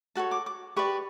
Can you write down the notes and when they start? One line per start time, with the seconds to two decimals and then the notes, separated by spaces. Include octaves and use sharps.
0.15 F#4 A4 C#5 A5
0.31 D6
0.46 D6
0.76 G4 B4 D5 C#6